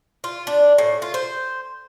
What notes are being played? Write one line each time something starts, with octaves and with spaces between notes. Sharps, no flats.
F4
D4
A2
F4
C5